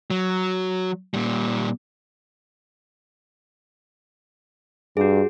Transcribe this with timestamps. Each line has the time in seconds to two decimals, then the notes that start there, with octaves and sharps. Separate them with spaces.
0.10 F#3
1.14 A#2 G3
4.97 G2 F#4 G#4